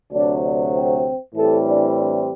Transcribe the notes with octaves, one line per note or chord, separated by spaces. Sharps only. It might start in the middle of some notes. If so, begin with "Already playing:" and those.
D2 C3 F#3 D4
D4
C4
A2 E3 G3 C4 A4
D4
D4